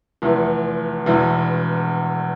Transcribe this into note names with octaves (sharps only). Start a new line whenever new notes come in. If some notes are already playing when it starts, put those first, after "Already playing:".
F1 E2 E3
E1 E2 E3